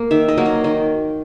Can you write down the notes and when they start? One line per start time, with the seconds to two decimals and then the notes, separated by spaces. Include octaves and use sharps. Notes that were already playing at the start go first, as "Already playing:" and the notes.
Already playing: A#3
0.11 D#3 E5
0.28 D#5
0.38 F#3 A#3
0.46 D#5
0.64 D#3 D#5